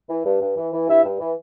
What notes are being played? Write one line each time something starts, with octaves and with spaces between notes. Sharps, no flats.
E3
G2
G2
E3
E3
G2 E4 E5
G2
E3